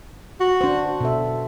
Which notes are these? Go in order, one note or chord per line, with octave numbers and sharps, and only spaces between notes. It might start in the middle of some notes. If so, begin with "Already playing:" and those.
F#4
D4 C5
B2 A4 E5